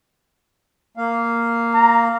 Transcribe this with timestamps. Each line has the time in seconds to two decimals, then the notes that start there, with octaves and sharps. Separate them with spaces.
0.97 A#3 F5
1.75 A#5